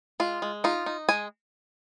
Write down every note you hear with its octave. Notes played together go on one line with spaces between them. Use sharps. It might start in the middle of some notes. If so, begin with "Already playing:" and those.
G#3 F4
G#3
D#4 F4
D#4
G#3 G#5